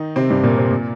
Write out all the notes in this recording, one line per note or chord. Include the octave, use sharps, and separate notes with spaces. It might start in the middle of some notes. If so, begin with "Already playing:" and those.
Already playing: D#3 D#4
C3 C4
G2 G3
A#2 A#3
C3 C4
A#2 A#3